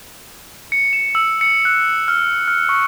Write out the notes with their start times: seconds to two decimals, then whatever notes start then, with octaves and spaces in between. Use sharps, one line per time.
0.72 C#7
0.93 E7
1.15 E6
1.41 C#7
1.65 F#6
2.08 F6
2.48 F6
2.69 C#6